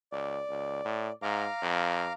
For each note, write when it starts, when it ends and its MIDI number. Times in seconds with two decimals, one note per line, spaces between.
0.12 0.40 37
0.12 1.12 74
0.50 0.83 37
0.85 1.09 45
1.22 1.47 44
1.22 2.13 77
1.22 2.13 82
1.22 2.13 86
1.62 2.10 41